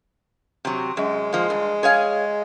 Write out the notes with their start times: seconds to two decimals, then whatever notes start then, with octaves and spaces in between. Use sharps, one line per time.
0.65 C3 F#3
0.97 F#2 G#3
1.33 F3 A#3
1.50 G2
1.83 G#4 C#5 F5